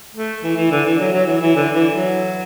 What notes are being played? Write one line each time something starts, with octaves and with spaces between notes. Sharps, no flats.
A3
E3
E3
D3
E3
F#3
F#3
E3
E3
D3
E3
F#3